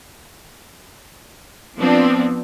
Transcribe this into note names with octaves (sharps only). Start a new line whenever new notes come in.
F3 B3 C4 D4